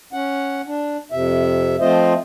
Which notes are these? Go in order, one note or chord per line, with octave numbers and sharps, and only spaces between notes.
C#4 F#5
D4
F2 C3 E5
F3 A3 C4 F4 C5 D#5